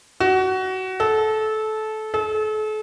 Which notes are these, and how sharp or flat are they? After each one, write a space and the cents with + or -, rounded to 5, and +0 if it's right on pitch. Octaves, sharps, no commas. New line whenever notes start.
F#4 +20
A4 -20
A4 -40